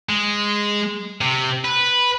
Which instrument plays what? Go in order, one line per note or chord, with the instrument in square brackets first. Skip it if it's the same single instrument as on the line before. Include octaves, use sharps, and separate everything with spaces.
[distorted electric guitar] G#3
C3
B4